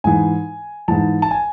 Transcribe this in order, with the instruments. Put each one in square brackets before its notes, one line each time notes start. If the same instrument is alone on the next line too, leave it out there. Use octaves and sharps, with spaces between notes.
[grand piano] G#2 E3 G#5
G#2 E3 A5
A5
G#5